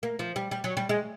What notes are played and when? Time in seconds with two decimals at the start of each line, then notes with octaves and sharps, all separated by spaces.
0.03 A#3
0.19 F3
0.36 G3
0.51 G3
0.64 F#3
0.77 G3
0.89 G#3